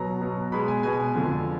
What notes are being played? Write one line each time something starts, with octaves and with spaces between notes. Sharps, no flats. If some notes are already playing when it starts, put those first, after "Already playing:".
Already playing: B2 F#3 A#5
B2 F#3
B2 G#3 B5
G#5
B2 G#3 G#5
F2 D3 F3